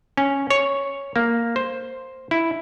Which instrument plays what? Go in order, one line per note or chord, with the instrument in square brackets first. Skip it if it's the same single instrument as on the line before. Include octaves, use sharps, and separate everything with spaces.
[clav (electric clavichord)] C#4
C#5
A#3
C5
E4